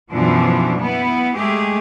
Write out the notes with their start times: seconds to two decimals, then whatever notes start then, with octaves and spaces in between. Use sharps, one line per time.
0.11 F#2 B2 E3 F3 D4
0.81 B3 E4
1.36 G#3 A3 G4 G#4